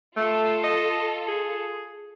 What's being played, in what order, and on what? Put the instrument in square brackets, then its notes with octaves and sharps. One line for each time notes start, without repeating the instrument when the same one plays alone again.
[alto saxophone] A3 [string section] F4 A4
[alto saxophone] D#5
G#4